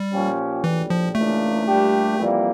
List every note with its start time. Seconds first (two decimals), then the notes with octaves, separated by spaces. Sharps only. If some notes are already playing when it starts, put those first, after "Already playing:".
Already playing: G3
0.12 A#2 F3 C#4 G4
0.64 A#1 A2 E3 G3
0.90 F3
1.15 C#2 C#3 E3 A3 A#3 D4
1.67 A#2 G3 D4 G4
2.18 F2 E3 G3 A#3